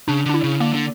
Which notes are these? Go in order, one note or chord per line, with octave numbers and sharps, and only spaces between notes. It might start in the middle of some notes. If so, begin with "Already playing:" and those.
C#3 D4
D3 D4
E4
C#3
D3 A#3
D3